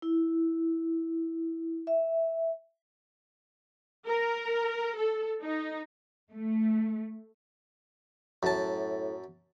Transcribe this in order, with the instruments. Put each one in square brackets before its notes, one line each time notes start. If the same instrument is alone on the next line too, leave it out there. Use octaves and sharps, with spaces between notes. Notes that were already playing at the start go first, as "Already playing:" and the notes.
[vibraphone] E4
E5
[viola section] A#4
A4
D#4
[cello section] A3
[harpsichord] F#2 A5 [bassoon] A2